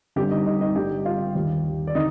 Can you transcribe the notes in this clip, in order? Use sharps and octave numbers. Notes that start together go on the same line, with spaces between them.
G1 G2 D3 G4 G5
D#4 D#5
D#4 D#5
D#4 D#5
G1 G2 D3 G4 G5
F4 F5
D#2 D#3
D5
D3 D#4 D#5